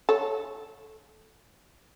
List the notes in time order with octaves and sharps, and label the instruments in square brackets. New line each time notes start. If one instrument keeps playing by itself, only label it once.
[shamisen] A4 C#5